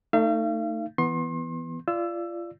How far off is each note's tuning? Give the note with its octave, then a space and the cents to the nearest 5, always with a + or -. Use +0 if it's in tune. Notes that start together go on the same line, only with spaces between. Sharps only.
A3 +25 D#4 +0 F5 -40
E3 +0 B3 +0 C6 +35
F4 -25 D5 +0 E6 +15